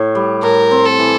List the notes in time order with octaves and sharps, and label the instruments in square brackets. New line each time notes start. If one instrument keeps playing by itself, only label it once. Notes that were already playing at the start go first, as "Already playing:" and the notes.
Already playing: [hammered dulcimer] A2
G3
[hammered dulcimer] A2 [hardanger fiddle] A#4
[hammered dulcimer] C4
[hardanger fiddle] A4
[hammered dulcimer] E3